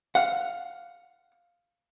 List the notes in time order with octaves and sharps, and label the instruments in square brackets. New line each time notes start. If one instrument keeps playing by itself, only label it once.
[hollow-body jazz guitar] F5 F#5